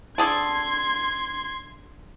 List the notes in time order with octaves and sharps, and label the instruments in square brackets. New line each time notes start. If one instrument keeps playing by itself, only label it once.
[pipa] D3 G#4 A4 [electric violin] C6 G#6